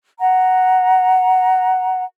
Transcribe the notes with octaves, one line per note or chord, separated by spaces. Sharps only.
F#5 A#5